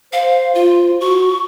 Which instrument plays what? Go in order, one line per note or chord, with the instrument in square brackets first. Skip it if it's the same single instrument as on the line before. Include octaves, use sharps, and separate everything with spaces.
[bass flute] C5 [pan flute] F5
[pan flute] F4
[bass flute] F#4 [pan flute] C#6